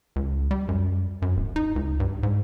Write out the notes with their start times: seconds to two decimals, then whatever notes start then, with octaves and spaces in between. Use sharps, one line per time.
0.16 C#2
0.51 G3
0.69 F#2
1.22 F#2
1.36 D1
1.56 D#4
1.76 C#2
2.00 G2
2.23 G#2